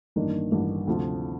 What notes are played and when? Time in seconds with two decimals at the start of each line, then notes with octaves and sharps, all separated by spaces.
0.16 A1 G2 D#3 A#3 D4
0.51 A1 G2 D#3 A#3 D4
0.87 D2 C3 F3